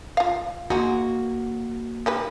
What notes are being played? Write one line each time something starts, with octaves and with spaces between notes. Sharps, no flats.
F4 F5
G#3 A#3 D#4 F#4
D#3 G3 B4